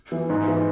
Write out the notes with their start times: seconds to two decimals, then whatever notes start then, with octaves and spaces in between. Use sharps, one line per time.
0.12 E3
0.30 G#2
0.48 E3